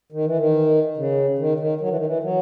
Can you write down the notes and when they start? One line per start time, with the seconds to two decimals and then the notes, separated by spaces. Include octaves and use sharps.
0.12 D#3
0.25 E3
0.38 D#3
0.97 C#3
1.39 D#3
1.60 D#3
1.81 F#3
1.89 E3
1.97 D#3
2.06 E3
2.23 F#3